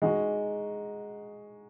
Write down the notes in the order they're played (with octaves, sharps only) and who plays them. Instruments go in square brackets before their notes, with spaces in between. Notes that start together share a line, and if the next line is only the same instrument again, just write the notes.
[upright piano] G#3 D#4 F#4